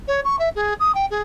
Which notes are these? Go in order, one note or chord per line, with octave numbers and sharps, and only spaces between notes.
C#5
C#6
E5
G#4
D#6
G5
G#4